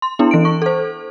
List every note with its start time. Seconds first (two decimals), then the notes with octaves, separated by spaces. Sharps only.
0.02 C6
0.19 B3 D4 E4
0.31 E3 D7
0.45 C#6
0.62 A4 C5